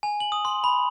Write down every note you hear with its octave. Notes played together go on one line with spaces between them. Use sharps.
G#5
F#7
D#6
C6
B5